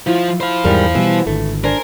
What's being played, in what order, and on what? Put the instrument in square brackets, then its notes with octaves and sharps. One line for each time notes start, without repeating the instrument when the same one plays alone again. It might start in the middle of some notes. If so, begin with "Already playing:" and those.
[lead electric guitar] F3 [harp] E4 F4
[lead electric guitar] C5 F5 [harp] B5
[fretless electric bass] E2 [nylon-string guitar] G#2 G3 A#4
[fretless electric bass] B2 G3 [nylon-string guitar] E3
[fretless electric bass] G#1 D3 [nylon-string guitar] A3
[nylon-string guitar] D4 [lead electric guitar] A#4 [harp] C5 G#5